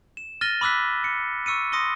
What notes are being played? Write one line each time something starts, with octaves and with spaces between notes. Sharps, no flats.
E7
F6 A6 A#6 D#7 G7
B5 D6 E6 F#6 B6
C#7
C#6 E6 C#7 D#7
C6 D#6 A#6 C#7 D#7 G7